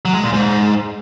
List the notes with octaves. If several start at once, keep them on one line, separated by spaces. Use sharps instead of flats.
F#3
G#3
A#2
G#2